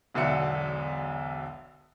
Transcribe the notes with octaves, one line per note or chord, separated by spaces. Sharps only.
E1 B1 D3 E5 C#7